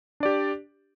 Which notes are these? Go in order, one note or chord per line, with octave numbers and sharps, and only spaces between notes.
D4 G4 D5